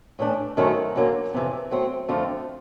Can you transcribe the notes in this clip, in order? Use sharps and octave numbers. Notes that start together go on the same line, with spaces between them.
A2 E3 A3 D4
F#2 D#3 F#3 A3 C4
F#2 D3 F#3 A#3
F2 C3 E3
F#3 A3 C4
F2 D3 F3 A3 C4